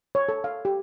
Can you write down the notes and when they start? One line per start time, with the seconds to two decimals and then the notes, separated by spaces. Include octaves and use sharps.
0.15 C#5
0.29 A4
0.44 F5
0.65 G4